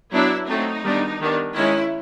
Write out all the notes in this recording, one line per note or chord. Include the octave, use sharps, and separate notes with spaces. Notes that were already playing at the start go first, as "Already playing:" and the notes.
F#3 B3 D4 E4
F#3 A3 C4 D#4
D#3 G3 B3 D4
D#3 G3 B3 D4
D#3 G#3 C#4 E4